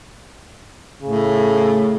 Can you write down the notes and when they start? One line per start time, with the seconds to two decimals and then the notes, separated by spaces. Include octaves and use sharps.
1.03 A2 C#3